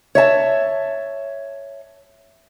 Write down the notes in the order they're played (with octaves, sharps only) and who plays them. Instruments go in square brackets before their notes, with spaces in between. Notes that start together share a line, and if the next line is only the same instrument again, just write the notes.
[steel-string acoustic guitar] C#5 E5 A5